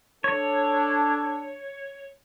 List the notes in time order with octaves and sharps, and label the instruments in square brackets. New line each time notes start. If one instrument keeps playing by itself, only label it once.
[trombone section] D4 A4 [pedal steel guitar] C#5